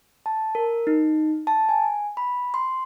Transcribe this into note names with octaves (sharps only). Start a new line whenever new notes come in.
A5
A#4
D#4
A5
G#5
B5
C6